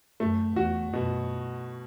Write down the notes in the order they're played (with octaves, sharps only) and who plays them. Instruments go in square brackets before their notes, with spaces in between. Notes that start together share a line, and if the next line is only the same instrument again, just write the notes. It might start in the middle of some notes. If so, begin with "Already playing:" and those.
[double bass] F#2 [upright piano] A3
[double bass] E2 [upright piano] F#4
[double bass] F#2 [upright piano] B2